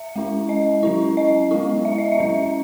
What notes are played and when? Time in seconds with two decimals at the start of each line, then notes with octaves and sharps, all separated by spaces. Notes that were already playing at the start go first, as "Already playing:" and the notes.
Already playing: E5
0.16 G#3 C#4 E4
0.49 D#5
0.83 F#3 C#4 E4
1.17 D#5
1.51 G#3 B3 E4
1.85 E5
1.98 D#5
2.12 E5
2.18 F#3 C#4 E4